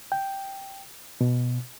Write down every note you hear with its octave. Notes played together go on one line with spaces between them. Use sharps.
G5
B2